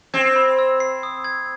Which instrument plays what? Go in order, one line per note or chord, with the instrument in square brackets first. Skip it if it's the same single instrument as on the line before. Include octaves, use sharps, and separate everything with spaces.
[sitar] C4 [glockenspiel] G#6
[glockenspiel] B5
E6
C7
D#6
G#6